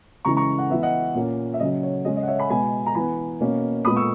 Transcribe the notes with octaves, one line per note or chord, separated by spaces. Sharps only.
C#3 E3 G#3 A#5 C#6
A#5 C#6
F#5
E3 B3 E5
D#5 F#5
A#2 A#3 C#4
E5
C#3 F#3 C#4 D#5
C#5
C#3 G#3 C#4 D#5
D#5
F#5
C#5 E5
G#5 B5
B2 G#3 B3 G#5 B5
A#5
E3 B3 G#5 B5
B2 A#3 C#4
A#2 G#3 B3 B5 D#6
C#6 E6